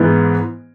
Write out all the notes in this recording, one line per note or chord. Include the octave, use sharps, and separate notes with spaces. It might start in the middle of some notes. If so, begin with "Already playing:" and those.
Already playing: G#2 E3 G#3 B3